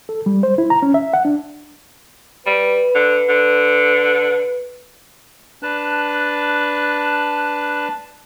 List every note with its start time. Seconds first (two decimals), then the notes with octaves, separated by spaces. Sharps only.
0.09 A4
0.26 G3
0.43 C5
0.58 E4
0.70 A#5
0.82 C#4
0.94 E5
1.13 F#5
1.25 D4
2.46 G3 B4
2.95 D3
3.29 D3
5.63 D4 B4 A5 F#6